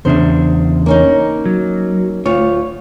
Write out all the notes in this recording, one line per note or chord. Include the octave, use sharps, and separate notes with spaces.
E2 C#3 D4 C5 E5
A#3 C#4 D#4
F#3
D2 F4 C#5